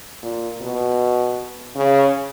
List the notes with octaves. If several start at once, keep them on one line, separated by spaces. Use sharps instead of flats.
A#2
B2
C#3